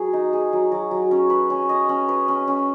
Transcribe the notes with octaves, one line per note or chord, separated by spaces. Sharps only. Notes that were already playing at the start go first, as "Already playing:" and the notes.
Already playing: F#3 G#4
D#4
G#4
F#3
F#3
F#3
C#4
B4
C#4
D#5
C#4
B4
C#4
C#4